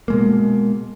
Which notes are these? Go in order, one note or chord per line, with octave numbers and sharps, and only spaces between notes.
B2 G#3 A#3